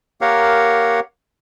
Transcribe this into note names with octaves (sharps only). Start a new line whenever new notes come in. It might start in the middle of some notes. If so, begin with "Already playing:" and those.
A#3 G4 A#4 C#5 F5 F#5